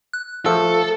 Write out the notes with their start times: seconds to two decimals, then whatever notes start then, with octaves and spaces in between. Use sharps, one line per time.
0.13 F#6
0.46 F3 A3 A4 E6